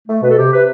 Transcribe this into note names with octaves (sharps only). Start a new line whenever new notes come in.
A3
B2 B4
A4
C3 G4
C3 B4